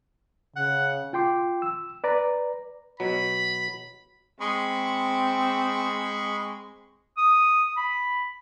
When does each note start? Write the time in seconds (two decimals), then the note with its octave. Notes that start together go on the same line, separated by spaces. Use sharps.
0.56 C#3 F#5
1.13 F4 G5 C6 D6
1.62 E6
2.04 B4 D5 A#5
3.00 B2 F#3 B5
4.41 G#3 C4 B5 C#6
7.17 D#6
7.77 B5